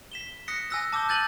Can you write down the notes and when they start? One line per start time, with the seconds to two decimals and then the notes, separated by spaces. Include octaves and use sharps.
0.12 B6 E7 G7
0.48 D#6 F#6 A#6 B6 C#7
0.70 G#5 D#6 E6 F#6 A#6
0.92 A5 D6 E6 G6 G7
1.09 F#6 G6 A6 D#7 F#7